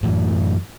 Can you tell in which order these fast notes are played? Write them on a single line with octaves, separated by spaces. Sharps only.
A2 E3 F#2